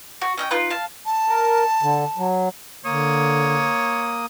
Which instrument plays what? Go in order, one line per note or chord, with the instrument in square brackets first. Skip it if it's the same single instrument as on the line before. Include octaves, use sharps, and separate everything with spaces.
[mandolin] F#4
C#4 D#5 G5
D#4 F4 B4
F5 A5
[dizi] A5
[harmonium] A#4
D3
F#3
[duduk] D3 [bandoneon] A#3 D#6 [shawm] C#5